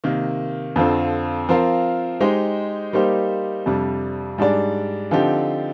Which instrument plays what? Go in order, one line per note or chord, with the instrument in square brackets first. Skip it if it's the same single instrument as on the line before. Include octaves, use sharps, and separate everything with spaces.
[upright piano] C3 D#3 A#3
F2 D3 F3 C4
F3 C4 F4 A#4 F5
G#3 D#4 G4 C5
G3 A#3 D#4 G4 C5
F2 C3 G3 D4
G#2 G3 D4 G#4 D5
D3 F3 C4 D#4 G4